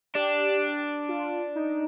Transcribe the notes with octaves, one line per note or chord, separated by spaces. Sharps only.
D4 G4
F4
D#4